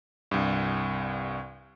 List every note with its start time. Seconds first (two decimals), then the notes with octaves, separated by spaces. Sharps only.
0.31 C2 G2